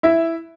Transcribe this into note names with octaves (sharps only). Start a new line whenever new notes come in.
E4 E5